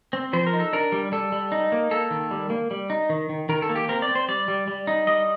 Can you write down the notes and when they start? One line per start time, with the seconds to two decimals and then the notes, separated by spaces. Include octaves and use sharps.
0.13 C4
0.33 F3 C5
0.47 A#4
0.53 D#4
0.60 A4
0.73 D4 A#4
0.92 G3
1.12 G3 A4
1.32 G3
1.52 D#4
1.72 A#3
1.91 A#3 A4
2.11 D#3
2.31 G3
2.50 A#3
2.71 G3
2.90 D#4
3.10 D#3
3.29 D#3
3.49 D#3 A#4
3.62 A4
3.69 A#3
3.76 G4
3.89 C4 A#4
4.02 D5
4.09 C4
4.15 C5
4.28 G3 D5
4.48 G3
4.68 G3
4.87 D#4
5.07 G3 D#5